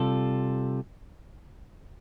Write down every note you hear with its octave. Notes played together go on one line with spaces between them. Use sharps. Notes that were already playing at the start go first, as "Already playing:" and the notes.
Already playing: C3 G3 F4 A4